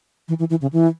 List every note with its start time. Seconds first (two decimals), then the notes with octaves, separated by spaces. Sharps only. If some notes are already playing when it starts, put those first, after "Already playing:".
0.28 E3
0.39 E3
0.50 E3
0.62 C#3
0.73 E3